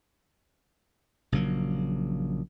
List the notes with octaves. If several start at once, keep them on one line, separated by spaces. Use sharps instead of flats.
A#1 C#3 F#3 A#3